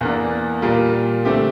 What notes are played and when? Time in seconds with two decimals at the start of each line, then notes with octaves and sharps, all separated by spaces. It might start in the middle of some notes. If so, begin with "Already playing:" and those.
0.01 E2 E3 A#3 D4
0.62 A#2 G3 A#3 F4
1.25 D3 A3 C4 G4